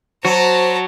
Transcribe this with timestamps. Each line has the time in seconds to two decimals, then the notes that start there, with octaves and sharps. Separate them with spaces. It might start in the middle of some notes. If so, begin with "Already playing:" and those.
0.25 F#3 F#4 C5 A5 A#5